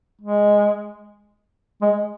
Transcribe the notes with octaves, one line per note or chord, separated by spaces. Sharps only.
G#3
G#3